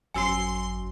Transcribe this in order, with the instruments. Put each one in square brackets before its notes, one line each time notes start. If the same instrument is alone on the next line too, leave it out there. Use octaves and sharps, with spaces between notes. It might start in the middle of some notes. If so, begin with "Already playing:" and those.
[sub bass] G#1 [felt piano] F#2 F#3 [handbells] G#5 E6 C7 [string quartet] C6